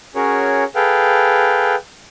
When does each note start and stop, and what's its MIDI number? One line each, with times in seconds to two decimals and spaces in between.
0.15 0.64 61
0.15 0.64 66
0.15 0.64 68
0.15 0.64 70
0.15 0.64 73
0.75 1.75 68
0.75 1.75 69
0.75 1.75 71
0.75 1.75 77
0.75 1.75 79